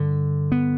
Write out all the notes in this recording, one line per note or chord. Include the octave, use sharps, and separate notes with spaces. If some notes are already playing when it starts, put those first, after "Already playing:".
Already playing: G2 D3
B3